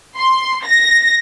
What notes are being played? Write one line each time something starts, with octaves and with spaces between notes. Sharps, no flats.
C6
A#6